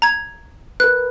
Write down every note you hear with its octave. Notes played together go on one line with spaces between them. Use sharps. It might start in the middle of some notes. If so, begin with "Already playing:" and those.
A#5 G#6
A#4 B4 F#6